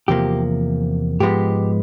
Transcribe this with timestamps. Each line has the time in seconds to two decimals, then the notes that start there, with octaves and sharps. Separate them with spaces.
0.08 E2 C3 F3 A#3 G4
1.20 G#2 F3 G#3 B3 G4